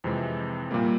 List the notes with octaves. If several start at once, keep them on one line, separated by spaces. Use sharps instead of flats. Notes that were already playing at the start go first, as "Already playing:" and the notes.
F2 C3 E3 G#3
A#2 G3 A#3